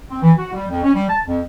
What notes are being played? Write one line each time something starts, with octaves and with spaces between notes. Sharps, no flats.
C4
E3
F#4
G3
F2
C#4
G3
A5
F2